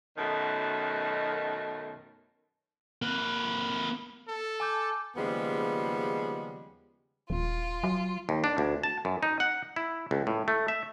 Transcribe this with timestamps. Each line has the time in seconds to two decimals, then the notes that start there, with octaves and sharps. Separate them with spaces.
0.17 F#2 B2 D#3 A3
3.02 A#3 B4
4.28 A4
4.60 G#5 D6 G6
5.16 D#2 C#3 F3 G3 G#3 B3
7.30 D#1 F4
7.84 F#3
8.29 D#2
8.44 D4
8.58 D2
8.83 A5
9.05 F#2
9.23 D#4
9.40 F#5
9.76 E4
10.11 C#2
10.27 A2
10.48 A3
10.68 E5